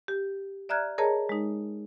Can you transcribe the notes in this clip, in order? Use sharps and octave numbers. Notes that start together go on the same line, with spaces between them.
G4
D5 E5 A#5 F6 F#6 G#6
G#4 A#4 C#5 D#5 A5 A#5
G#3 D#4